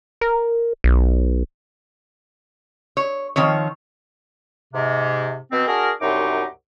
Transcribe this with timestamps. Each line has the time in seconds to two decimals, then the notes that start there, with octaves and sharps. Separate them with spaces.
0.21 A#4
0.84 B1
2.97 C#5
3.36 D#3 F3 C4 C#5
4.74 G#2 C3
5.52 B2 C4
5.68 D4 F#4 G#4 A#4
6.01 C2 F#2 F#3 D#4 G4 D6